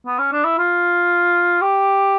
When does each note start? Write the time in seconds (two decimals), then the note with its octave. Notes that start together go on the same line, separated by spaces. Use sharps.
0.06 B3
0.19 C#4
0.32 D4
0.45 E4
0.58 F4
1.62 G4